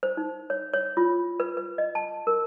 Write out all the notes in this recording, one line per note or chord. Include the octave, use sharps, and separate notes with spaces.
C5
D#4
C#5
C#5
F4
B4
B4
D#5
A5
A#4